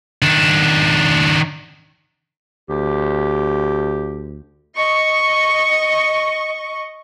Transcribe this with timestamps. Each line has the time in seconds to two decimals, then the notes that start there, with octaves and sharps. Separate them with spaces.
0.22 D#3 D4
2.70 D2 G4
4.74 D#5 C#6